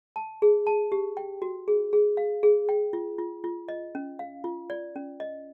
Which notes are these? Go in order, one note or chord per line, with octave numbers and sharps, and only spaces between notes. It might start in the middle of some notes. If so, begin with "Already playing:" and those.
A5
G#4
A5
G4
G5
F#4
G#4
G#4
F5
G#4
G5
F4
F4
F4
D#5
C#4
F5
F4
D5
C#4
D#5